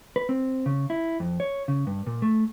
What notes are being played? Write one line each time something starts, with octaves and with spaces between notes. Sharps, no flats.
B4
C4
C#3
E4
F2
C#5
C#3
G2
A#2
A3